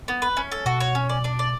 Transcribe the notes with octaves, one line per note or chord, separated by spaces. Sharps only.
B3
B4
C#4
A4
B2 F#4
C#5
C#4
D5
D4
D5